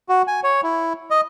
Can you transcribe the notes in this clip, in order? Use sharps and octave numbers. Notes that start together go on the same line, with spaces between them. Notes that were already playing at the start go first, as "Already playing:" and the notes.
F#4
G#5
C#5
E4
D#5